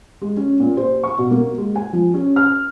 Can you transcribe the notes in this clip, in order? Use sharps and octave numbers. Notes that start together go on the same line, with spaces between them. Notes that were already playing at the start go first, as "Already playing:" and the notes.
G#3
C#4
A#2
C5
C#6
B2
A#3
G#3
G#5
F3
C#4
F6